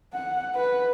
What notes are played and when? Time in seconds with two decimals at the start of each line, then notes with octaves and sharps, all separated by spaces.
0.13 F#5
0.55 B4